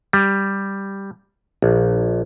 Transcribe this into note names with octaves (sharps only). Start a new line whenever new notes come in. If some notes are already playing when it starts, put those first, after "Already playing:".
G3
A#1